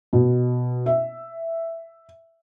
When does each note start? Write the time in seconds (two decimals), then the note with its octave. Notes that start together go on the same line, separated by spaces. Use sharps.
0.13 B2
0.86 E5